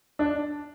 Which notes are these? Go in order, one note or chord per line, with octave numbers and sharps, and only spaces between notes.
D4